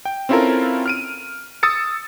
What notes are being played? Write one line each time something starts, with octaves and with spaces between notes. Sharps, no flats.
G5
C4 C#4 E4 F4 A4 A#4
F6 D7 D#7
D#6 E6 A6 C#7